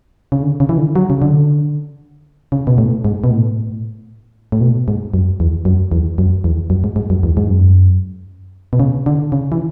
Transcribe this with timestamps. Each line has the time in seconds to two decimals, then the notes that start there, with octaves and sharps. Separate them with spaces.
0.32 C#3
0.43 D3
0.60 C#3
0.69 E3
0.78 D3
0.96 F#3
1.10 C#3
1.22 D3
2.52 C#3
2.67 B2
2.78 A2
3.05 G#2
3.24 B2
3.31 A2
4.52 A2
4.61 B2
4.88 G#2
5.14 F#2
5.40 E2
5.65 F#2
5.92 E2
6.18 F#2
6.44 E2
6.70 F#2
6.84 G#2
6.96 G#2
7.10 F#2
7.23 E2
7.37 G#2
7.50 F#2
8.73 B2
8.80 C#3
9.06 D3
9.32 C#3
9.52 E3